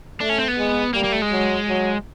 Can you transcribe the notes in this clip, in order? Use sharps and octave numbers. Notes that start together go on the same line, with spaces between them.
A3 D4
C#4
C4
B3
G#3
G3 A#3
A#3
A3
G#3
F#3
F#3